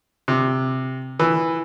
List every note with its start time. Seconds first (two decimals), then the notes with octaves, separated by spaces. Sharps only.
0.28 C3
1.19 E3